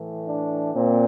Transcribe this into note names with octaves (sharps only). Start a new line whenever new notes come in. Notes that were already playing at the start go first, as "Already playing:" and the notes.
Already playing: A2 E3
D4
A#2 C4